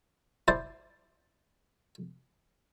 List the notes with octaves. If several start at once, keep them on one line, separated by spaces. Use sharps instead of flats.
E4 C5 D5 A5